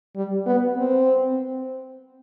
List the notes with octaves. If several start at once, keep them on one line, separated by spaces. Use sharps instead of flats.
G3
B3
C4